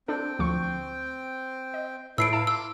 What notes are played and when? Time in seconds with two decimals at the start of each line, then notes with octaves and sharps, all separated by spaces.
0.08 C4 D4 A4 G5
0.39 D2 F3 C#6
1.74 D#5
2.18 A2 E4 A4 B4 E6 C7 D7
2.33 E4 F5 A5
2.47 C6 D6 E6